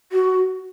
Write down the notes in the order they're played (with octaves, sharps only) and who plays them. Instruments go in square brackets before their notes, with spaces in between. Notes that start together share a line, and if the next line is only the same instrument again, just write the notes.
[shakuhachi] F#4